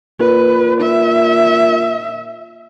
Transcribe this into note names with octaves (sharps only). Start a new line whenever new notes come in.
A#2 B4
E5